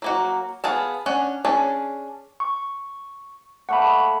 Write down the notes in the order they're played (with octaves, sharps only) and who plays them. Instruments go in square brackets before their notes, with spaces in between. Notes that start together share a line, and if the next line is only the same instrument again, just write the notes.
[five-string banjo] F#3 A#3 F#4
B3 G#4 F5 A5
C#4 D4 F#5
C#4 D4 G#4 A5
[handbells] C#6
[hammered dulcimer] A3 A#3 C#5 [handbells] F#5 B5